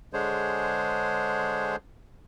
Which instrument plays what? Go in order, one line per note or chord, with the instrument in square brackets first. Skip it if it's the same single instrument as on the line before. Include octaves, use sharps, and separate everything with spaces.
[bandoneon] D3 G#3 D4 G#4 C5 C#5